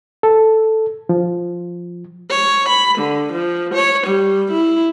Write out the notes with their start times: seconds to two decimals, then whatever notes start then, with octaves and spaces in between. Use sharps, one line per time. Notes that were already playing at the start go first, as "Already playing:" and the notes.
0.23 A4
1.09 F3
2.30 C#5
2.68 B5
2.98 D3
3.32 F3
3.74 C#5
4.06 G3
4.51 E4